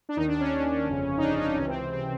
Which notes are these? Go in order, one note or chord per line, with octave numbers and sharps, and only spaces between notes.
D4
D#2 D#3 D#4
D4
C#4
G1 F2 C#3
D#4
D4
D#4
C#2 C3 E3 C#4
C4
C4